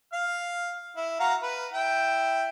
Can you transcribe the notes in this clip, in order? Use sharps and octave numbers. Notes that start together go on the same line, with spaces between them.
F5 F6
E4
F#4 F5 A#5
B4
E4 G5